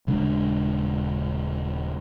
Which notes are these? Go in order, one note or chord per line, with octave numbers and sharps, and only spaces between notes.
D#1 C#3 G#3 D4